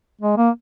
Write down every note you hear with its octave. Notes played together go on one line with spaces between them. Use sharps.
G#3
A#3